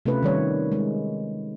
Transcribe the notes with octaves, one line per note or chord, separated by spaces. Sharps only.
C3 A3 C#4 F4 B4
D#3 G3 C#5
G#3